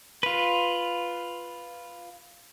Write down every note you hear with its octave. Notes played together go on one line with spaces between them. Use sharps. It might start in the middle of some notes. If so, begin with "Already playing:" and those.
F4 B4